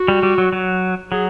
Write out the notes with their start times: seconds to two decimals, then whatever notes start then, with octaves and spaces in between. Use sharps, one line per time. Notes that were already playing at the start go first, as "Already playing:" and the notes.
Already playing: F#4
0.08 G3
0.23 G3
0.38 F#3
0.53 F#3
1.12 F#3 G#4